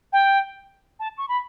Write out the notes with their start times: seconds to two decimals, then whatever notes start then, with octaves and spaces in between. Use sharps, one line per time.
0.13 G5
0.99 A5
1.18 C#6
1.28 B5